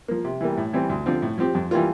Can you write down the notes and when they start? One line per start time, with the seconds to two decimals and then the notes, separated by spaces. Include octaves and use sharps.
0.08 F3 A#3
0.25 C3
0.41 E3 G3 A#3
0.57 A2
0.73 E3 G3 C4
0.90 D2
1.06 D3 F3 C4 F4
1.22 A2
1.38 F3 C4 G4
1.55 F2
1.71 E3 G3 A#3 F4